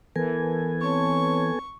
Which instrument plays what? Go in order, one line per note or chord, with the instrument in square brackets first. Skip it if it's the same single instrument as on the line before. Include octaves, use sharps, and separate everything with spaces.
[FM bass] E3 [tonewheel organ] B3 A4 G#5 [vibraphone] A#4
[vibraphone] C4 C#5 A5 [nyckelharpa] C#6